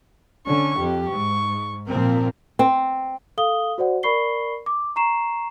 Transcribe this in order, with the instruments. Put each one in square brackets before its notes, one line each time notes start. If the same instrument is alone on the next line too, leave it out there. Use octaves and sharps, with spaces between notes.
[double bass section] D3 [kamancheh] C#4 C#6
[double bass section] F2 [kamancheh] G4
[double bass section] G#2 [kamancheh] C#6
[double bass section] A#2 F3 C4 [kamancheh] A#4
[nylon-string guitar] C4
[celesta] A4 F5 D#6 G7
F#4 C5 D5 F#5
A#4 D5 B5 C#6 C7 G7
D6
A#5 C#6 C7 E7